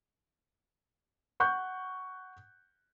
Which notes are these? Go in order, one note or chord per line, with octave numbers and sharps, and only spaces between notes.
F#5 C#6 F#6 G6